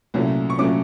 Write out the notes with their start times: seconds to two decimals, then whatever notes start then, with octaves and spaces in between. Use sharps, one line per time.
0.14 C2 A#2 F#3 A3 C#4
0.50 C#6
0.59 A#2 F#3 A3 C#4 D6